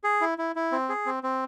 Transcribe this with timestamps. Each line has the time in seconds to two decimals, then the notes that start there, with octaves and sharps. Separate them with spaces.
0.04 G#4
0.21 E4
0.38 E4
0.56 E4
0.72 C4
0.89 G#4
1.06 C4
1.23 C4